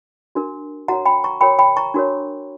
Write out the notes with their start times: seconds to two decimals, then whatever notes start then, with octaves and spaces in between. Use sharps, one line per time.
0.35 D4 F#4 A#4
0.88 F#4 A#4 C#5 F#5 A#5
1.05 G5 B5
1.24 A#5 C#6
1.41 F#4 A#4 C#5 G5 B5
1.59 G5 B5
1.77 A#5 C#6
1.94 D4 F#4 A#4 C#5